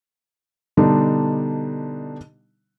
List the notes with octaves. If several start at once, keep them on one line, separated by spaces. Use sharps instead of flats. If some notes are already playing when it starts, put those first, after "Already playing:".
B2 D3 G3 D4 D#4